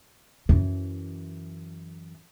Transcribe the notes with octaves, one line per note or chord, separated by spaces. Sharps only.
F#2 E3